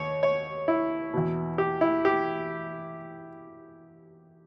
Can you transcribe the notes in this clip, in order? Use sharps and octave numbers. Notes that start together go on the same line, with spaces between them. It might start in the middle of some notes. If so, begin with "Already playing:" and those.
Already playing: D#2 C#5
C#5
E4
E2 B2
G4
E4
G4